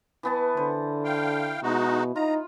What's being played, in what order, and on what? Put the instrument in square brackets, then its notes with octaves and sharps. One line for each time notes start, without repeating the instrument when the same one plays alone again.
[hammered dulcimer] E3 B3 A5
[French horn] D3 [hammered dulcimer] C5
[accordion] F5 G5
[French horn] B2 [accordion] G#3 D#4 F#4
[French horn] D#4 [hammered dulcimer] F4 [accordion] A#5